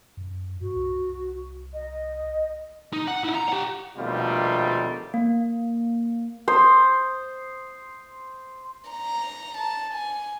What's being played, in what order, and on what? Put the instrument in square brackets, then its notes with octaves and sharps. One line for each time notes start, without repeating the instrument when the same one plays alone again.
[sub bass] F#2
[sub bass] G2 [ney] F#4
[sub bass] C2
[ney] D#5
[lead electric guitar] D#4
F#5
D#4 E4
A#5
G4 F#5
[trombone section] A#1 D#2 B2 G3 A3 F4
[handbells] A#3
[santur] C5 D#6
[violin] A#5
A5
G#5